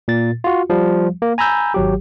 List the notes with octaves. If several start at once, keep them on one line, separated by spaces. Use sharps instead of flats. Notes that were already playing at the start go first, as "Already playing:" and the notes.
A#2 A6
F4 F#4
F3 G3
A#3
G#5 A#5 B5 E6 G6
G#1 F#3 G4